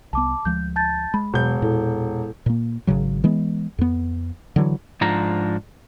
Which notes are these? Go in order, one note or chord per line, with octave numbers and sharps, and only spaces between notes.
C2 B3 A5 D6
D2 F3 G#3 G6
A5 G6 A6
G#3 B5
E1 B2 F#3 G6
A#2 E4 A4
A#2 A#3
G#1 D#2 C#3 F#3
E3 G#3 B3
F2 B3
D3 E3 F#3
G#2 F3 D4 A#5